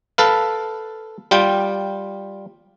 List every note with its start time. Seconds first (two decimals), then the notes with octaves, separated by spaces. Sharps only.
0.18 A4 B4 F5
1.31 G3 F4 G5